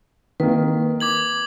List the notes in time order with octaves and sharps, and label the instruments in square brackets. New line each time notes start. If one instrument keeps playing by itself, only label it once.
[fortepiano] D#3 A#3 [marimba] B4
[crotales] D6 G#6 F#7